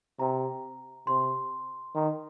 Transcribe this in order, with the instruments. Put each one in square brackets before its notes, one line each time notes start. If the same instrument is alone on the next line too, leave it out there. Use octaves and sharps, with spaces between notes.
[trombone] C3 [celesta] A#5
[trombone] C3 [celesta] C6
[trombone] D#3